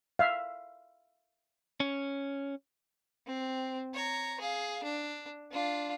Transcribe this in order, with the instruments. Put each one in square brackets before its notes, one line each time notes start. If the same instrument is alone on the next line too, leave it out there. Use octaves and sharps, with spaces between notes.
[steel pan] E5 F5
[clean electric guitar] C#4
[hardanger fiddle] C4
C#5 A#5
G#4 F5
D4
D4 F4